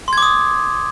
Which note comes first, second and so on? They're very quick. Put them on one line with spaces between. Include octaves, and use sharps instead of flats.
C6 G#6 D6 D#6